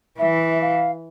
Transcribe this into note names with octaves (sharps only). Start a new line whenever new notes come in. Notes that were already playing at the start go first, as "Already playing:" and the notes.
E3 E5
F5